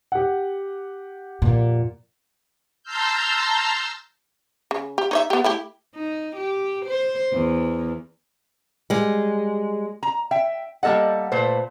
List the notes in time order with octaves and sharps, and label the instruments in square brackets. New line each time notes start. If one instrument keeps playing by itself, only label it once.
[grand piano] G4 F#5
[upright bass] F2 A#2
[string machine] A5 A#5 C6 E6 F6 G6
[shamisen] C#3
G4
D#4 C#5 E5
B3 G4
A3 E4 G4
[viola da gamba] D#4
G4
C5
E2
[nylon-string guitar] G3 G#3
[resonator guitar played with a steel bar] A#5
E5 G5
G3 A#3 A4 D#5 F#5
A#2 A3 B4 C5